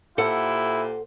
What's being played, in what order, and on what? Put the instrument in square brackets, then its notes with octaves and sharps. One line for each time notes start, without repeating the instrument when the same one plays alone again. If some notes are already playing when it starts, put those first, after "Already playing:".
[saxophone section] A#2 G4 C5 [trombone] E4 [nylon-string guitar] A4 F#5